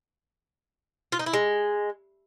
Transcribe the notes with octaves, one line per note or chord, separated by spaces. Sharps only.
F4
D#4
E4
G#3